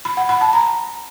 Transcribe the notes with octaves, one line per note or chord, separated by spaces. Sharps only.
B5
F#5
B5
A5
A#5